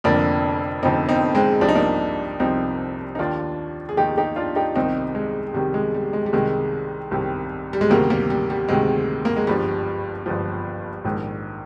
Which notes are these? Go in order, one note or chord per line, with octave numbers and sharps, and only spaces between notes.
F1 F2 D3 A#3 D4
F1 F2 D3 C4 D#4
C4 D#4
G#3 C4
C2 C3 F3 D4
D#4
A#3 D4
C2 C3 F3 C4 D#4
D#4
D#2 D#3 D4 F4
G#4
D#2 D#3 D#4 G4
D#4 G4
D4 F4
D#4 G4
C2 C3 D#3 C4 D#4
G#3
C2 C3 D#3 G3
G#3
G3
G#3
G3
C2 C3 D#3 G#3
C2 C3 D#3
G3
G#3
D2 C3 D#3 G3 A#3
G3 A#3
G3
G3
D2 C3 D#3 G#3
A#3
G#3
G1 G2 F3 G3
G1 G2 F3
A#1 G#2 D#3